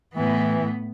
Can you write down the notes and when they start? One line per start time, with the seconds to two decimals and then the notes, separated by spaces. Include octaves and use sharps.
0.15 A2 E3 B3